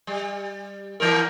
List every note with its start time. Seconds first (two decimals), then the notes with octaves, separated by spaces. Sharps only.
0.07 G3
1.00 E3 B3 A#4